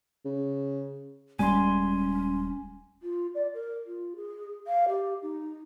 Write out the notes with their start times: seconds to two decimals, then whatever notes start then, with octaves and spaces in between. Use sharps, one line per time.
0.25 C#3
1.39 D#1 G3 G#3 C#4 G#5 C6
3.02 F4
3.34 D5
3.54 A#4
3.86 F4
4.16 G#4
4.67 F5
4.88 G4
5.22 D#4